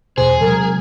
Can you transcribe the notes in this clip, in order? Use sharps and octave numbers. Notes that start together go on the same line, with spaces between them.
E2 B2 G#4 C5
C3 F#3 G#3 A#4